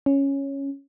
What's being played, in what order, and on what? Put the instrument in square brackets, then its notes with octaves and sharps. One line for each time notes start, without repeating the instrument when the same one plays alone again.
[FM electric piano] C#4